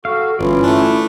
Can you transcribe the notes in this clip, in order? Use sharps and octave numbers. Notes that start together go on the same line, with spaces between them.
F#4 A4 F5
G1 E3 C#4 F4 D5
A3 D4